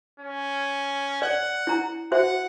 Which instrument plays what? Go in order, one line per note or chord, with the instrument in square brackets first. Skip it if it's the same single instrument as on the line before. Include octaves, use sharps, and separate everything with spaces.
[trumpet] C#4
[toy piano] D5 [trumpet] F#5
[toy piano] E4 A#5
[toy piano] F#4 C5 E5 [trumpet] F#5